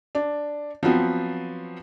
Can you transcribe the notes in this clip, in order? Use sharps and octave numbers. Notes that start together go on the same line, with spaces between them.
D4
F3 F#3 B3 C4